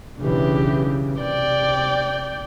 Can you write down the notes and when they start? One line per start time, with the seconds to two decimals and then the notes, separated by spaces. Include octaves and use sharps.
0.19 B1 C#3 E3 D4 G4
1.20 C3 D5 G5